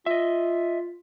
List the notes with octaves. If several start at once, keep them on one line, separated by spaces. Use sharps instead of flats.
F4 D#5 E5